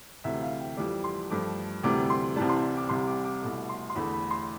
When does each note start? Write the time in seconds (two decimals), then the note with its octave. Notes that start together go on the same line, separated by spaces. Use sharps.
0.24 D2 C3 E3 E5
0.42 F5
0.60 G5
0.77 F2 E3 G3 D6
1.04 C6
1.30 G2 F3 A3 D6
1.83 D2 C3 E3 G3 D6
2.10 C6
2.36 C2 C3 E3 G3 A5
2.49 C6
2.77 D6
2.89 C2 C3 G3 C6
3.07 D6
3.24 D6
3.42 C2 B2 A3 D6
3.69 C6
3.90 C6
3.95 E2 D3 A3 B5
4.13 B5
4.31 C6